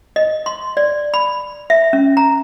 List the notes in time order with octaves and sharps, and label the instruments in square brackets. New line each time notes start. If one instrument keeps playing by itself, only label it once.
[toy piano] D#5
C6
D5
B5
E5
C#4
A#5